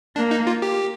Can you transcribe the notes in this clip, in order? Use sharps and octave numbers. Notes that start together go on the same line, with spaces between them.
A#3 D4
D#4
F4
G4